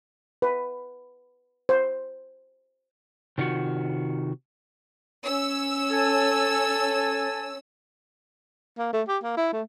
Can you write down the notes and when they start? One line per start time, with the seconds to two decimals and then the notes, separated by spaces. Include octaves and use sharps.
0.42 B4
1.69 C5
3.38 C3 D#3 F4 F#4
5.24 C#4 E6
5.91 A4 G#5 A5
8.78 A#3
8.93 A3
9.08 G4
9.24 A#3
9.37 E4
9.53 A3